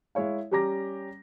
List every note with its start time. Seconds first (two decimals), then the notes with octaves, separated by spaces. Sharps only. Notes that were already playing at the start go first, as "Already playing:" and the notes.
0.15 G#3 E4 C#5 F5
0.51 G3 C#4 G4 A#5 D6 A#6